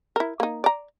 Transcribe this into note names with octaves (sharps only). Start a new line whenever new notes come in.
E4 A#4
A#3 D#4
D5 A#5